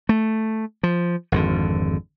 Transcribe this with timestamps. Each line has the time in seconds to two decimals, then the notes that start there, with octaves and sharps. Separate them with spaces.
0.09 A3
0.83 F3
1.32 G#1 F2 D3